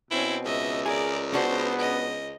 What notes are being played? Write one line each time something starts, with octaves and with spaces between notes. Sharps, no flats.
B2 C4 C#4 E4
C#2 D#5 E5
G#4 A#4 D5
B3 C#4 D4 F#4 C5
D#5